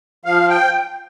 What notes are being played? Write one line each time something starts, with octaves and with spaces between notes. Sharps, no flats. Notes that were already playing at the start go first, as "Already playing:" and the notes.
F3 F5
G5